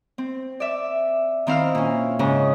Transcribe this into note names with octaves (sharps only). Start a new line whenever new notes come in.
C4
D5 E5
D#3 C4 E4 F5 E6 F6
A#2 C#4
G#2 C#3 C#4 D#5